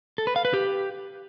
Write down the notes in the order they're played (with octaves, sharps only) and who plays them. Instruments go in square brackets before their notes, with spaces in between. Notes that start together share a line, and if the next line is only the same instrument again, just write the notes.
[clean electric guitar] A4
B4
F5
B4
G4